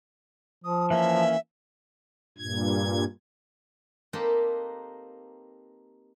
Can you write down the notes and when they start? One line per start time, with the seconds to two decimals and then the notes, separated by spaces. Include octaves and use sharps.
0.64 F3 D#6
0.90 E3 A#3 C#4 E5
2.38 G2 A#2 G#6
4.13 A#3 C4 D#4 G4 A4 B4